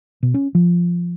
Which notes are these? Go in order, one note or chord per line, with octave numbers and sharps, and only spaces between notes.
B2
C#4
F3